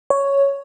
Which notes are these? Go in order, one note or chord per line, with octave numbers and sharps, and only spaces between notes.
C#5